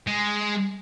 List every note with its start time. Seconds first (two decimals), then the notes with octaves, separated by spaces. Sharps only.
0.07 G#3